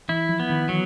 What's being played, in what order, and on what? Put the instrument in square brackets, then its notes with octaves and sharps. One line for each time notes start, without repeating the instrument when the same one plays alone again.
[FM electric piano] E3 [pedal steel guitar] E4
[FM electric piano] F3
[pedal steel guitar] B3
[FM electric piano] D#3
[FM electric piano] E3 [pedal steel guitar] F#3